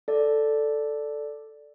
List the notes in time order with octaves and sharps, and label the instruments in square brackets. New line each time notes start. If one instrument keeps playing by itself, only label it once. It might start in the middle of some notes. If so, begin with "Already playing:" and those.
[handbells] A4 D5